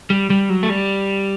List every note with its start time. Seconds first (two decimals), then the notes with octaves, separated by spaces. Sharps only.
0.10 G3
0.30 G3
0.50 F#3
0.63 A3
0.70 G3